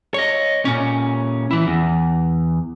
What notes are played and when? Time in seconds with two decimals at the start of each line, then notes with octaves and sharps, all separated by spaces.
0.14 C#5 D#5
0.65 A#2 C#4
1.51 E3 E4
1.67 E2